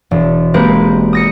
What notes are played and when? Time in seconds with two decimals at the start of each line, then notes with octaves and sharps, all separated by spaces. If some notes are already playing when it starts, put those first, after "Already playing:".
0.11 E1
0.54 G#3 A#3 C4 G4 B4
1.13 D#6 A#6 C#7